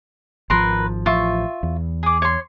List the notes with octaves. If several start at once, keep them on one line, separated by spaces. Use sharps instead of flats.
G#1 F3 A#4 B4 C6
A1 F3 F4 E5 C#6
E2
G#4 D6
C#5 C6